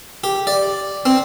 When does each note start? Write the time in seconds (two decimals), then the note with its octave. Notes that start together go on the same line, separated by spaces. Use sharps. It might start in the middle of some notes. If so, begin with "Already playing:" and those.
0.24 G4
0.47 D5
1.06 C4